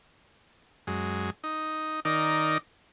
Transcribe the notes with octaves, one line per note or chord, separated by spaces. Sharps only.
F#2 G#3
D#4
D#3 D#4 A#4 D5